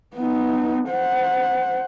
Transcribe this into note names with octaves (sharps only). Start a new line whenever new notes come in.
B3 D#4
C5 F#5